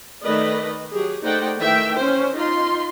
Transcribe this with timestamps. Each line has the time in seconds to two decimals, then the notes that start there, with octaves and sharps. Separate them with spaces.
0.22 D#3 A3 B4 D5 D#5
0.91 F#3 G4 G#4
1.23 A3 D#4 C5 D5 F#5 G5
1.57 D#3 E3 A3 E5 G5
1.98 C#4 C5
2.33 D#4 F4 C6